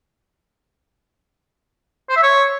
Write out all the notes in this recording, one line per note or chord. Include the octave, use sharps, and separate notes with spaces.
C5
E5
C#5